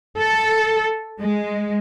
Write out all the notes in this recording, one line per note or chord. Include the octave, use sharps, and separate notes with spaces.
A4
G#3